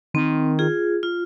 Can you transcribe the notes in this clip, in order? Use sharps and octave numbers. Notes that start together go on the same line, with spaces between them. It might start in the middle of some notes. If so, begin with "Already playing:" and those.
D#3 C4
F4 G#4
F4